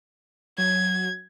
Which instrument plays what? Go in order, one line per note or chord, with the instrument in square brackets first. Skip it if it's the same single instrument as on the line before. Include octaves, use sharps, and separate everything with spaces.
[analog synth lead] F#3 [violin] G#6